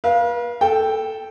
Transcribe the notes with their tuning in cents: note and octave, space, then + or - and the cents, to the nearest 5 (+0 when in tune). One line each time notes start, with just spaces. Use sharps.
B4 -40 F5 +0
A4 +0 G5 +0